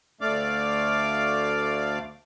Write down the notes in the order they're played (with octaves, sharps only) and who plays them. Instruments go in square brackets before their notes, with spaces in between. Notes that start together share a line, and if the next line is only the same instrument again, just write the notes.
[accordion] D2 A3 D5 F5 D6